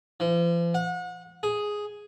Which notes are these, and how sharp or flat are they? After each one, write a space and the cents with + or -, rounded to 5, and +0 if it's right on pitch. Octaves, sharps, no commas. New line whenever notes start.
F3 -45
F#5 -35
G#4 +0